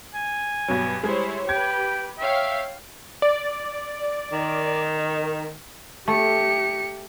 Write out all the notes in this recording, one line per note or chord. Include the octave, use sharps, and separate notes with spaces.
G#5
G2 B2 F#3
G3 G#3 E4 G#4 C5 C#5
G4 B4 G5 G#6
C#5 E5 F5 G5
D5
D#3
A3 G4 C#7